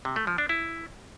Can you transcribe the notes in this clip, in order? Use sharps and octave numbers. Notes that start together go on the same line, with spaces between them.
C3
A3
F3
D4
E4